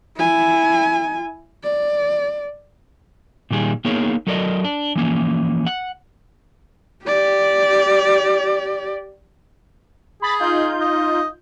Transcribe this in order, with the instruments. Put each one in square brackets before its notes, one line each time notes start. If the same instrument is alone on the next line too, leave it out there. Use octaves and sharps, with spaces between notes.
[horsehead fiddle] E4 G#5
D5
[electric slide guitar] A#2 D#3 G3 G#4
A#3 B3 D#4 G#4 A#4 C#5
F#3 A4 A#4 D5 D#5
D4
E3 F3 A#3 C#4
F#5
[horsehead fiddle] G4 D5
[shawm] G#4 [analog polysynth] B5 A6
[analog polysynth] D#4 F4 G6
[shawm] D#5